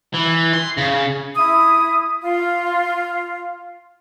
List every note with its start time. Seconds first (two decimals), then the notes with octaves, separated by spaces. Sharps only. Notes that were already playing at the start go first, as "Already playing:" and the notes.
0.14 E3
0.54 C6
0.78 C#3
1.35 E4 D#6
2.22 F4